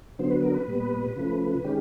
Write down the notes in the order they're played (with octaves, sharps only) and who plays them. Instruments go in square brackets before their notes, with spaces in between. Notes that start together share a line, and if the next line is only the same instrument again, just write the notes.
[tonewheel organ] D3 F#3 B3 C5
B4
A#4
B4
A#2 G3 B3
C#3 F3 A3 B4
D#3 G#3 C#4 G4